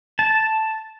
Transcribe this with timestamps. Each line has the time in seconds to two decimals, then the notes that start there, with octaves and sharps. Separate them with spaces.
0.19 A5